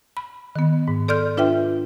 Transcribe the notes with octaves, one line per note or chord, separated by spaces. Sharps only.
B5
D#3 B3
G#2
A4 D5 C6 F6 G6
D4 F4 B4 E5 G5